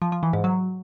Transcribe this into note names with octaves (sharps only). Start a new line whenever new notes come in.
F3
F3
E3
G#2
F#3